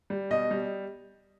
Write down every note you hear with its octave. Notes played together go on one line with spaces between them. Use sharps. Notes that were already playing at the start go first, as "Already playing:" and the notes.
G3
B2 D#5
G3